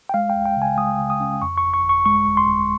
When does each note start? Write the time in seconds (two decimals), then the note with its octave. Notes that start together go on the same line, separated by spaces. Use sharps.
0.09 G5
0.14 G#3 F5
0.30 G5
0.35 C#2
0.46 G5
0.57 C#3 G#5
0.78 G#3 D#6
0.99 C#3
1.10 D#6
1.20 C#4
1.41 F2 C#6
1.58 C#6
1.63 G1
1.74 C#6
1.84 G1
1.89 C#6
2.06 G#3 C#6
2.27 G1
2.37 C6
2.48 G1